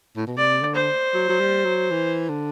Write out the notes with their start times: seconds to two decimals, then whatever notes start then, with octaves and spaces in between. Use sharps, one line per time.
0.17 A2
0.27 B2
0.37 C3 D5
0.62 D3
0.75 C5
1.14 F#3
1.29 F#3
1.40 G3
1.65 F#3
1.91 E3
2.29 D3